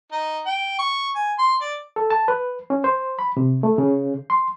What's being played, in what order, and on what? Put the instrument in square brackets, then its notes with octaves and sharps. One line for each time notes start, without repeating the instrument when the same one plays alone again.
[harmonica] D#4
G5
C#6
G#5
C6
D5
[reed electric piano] A4
A5
B4
C#4
C5
B5
C3
A3
C#3
C6